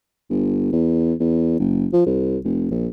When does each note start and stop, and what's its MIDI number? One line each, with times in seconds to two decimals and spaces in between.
0.30 0.71 31
0.73 1.13 40
1.20 1.57 40
1.60 1.87 30
1.93 2.03 53
2.06 2.38 36
2.44 2.66 29
2.71 2.88 34